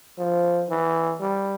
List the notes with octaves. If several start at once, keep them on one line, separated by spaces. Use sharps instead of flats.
F3
E3
G3